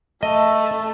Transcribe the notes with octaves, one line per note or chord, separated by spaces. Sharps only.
A3 D#5